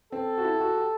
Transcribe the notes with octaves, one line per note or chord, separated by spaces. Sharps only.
C4 A4
F#4
E4
G4
F#4
G4